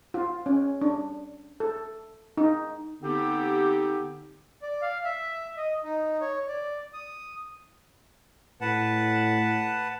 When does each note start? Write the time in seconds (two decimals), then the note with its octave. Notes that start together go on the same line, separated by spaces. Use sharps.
0.14 F4
0.46 C#4
0.82 D4
1.60 A4
2.37 D#4
3.03 D3 B3 C4 D#4 G4
4.62 D5
4.82 F5
5.04 E5
5.57 D#5
5.84 D#4
6.21 C#5
6.48 D5
6.93 D#6
8.61 A2 B4 F#5 A5